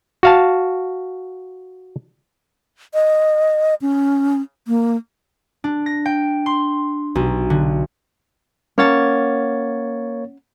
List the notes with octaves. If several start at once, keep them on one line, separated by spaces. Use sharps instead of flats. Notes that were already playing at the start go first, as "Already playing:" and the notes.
F#4 F5 A5
D#5
C#4
A#3
D4
A#6
G5
C6
B1
D3
A#3 C#4 C#5 F#5 A5 A6